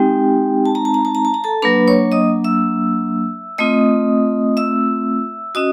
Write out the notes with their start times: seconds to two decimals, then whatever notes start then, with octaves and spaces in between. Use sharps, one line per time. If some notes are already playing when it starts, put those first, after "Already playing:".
Already playing: G#3 C4 D#4 G4 G5
0.65 A5
0.75 A#5
0.85 A5
0.94 A#5
1.05 A5
1.15 A#5
1.25 A5
1.34 A#5
1.44 A4 A5
1.62 F#3 A#3 D4 B4 B5
1.88 C#5 C#6
2.12 D#5 D#6
2.44 E5 E6
3.58 A3 C4 F4 D#5 D#6
4.57 E5 E6
5.55 C#4 F#4 D#5 D#6